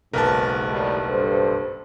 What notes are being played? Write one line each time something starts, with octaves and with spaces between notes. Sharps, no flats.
F#1 B1 G#2 A#4 B4 A5
A2 D#3 G3
G2 A4 C5